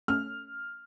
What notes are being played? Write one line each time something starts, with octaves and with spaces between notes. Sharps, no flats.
A3 C#4 F6